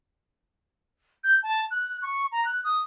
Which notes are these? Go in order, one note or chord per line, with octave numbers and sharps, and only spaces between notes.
G6
A5
F#6
C#6
A#5
F#6
D#6